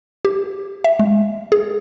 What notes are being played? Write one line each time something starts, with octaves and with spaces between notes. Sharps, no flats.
G4
E5
G#3
G#4